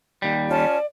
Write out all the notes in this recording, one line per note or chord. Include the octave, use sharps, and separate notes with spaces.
D#2 G3
C#4 F4 D5 A5